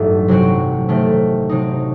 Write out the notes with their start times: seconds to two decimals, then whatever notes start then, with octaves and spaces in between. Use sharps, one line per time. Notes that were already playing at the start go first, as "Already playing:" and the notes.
Already playing: A1 G2 F#3 A3 D#4
0.28 C3 F#3 C4 F#4
0.89 C3 D#3 A3 C4
1.49 C3 F#3 C4 D#4